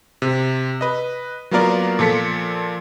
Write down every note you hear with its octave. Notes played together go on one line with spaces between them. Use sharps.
C3
B4 D#5
F#3 A#3 B3 F4 A#4 D5
A#2 F3 A4 B6 C#7